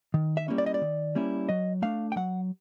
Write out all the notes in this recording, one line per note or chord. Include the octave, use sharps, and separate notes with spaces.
D#3
E5
G3 A#3 C#4 E4
D5
D#5
D5
D#3
G3 A#3 C#4 E4
F#3 D#5
A3 D4 F5
G5
F#3 F#5